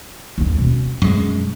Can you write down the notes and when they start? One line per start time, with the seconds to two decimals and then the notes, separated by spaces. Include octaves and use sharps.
0.38 D#2 D4
0.55 B2 C#4
1.02 F#2 G#3